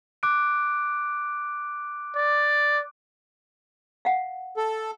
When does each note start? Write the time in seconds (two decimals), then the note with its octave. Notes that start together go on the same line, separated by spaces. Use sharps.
0.23 D6 F#6 D7
2.16 D5
4.05 F5 F#5
4.57 A4